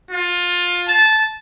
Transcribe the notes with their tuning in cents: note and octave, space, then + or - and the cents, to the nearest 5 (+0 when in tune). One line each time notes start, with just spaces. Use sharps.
F4 +20
A5 -15